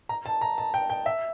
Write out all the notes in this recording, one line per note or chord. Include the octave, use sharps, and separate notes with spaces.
A#5
A5
A#5
A5
G5
G5
E5